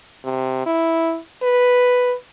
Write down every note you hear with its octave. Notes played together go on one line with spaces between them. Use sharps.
C3
E4
B4